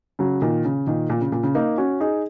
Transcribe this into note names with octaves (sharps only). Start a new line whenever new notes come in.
C#3 F#3
A#2 D#3
C#3
A#2 D#3
A#2
C#3
A#2
C#3
A#3 D#4
C#4 F#4
D#4 G#4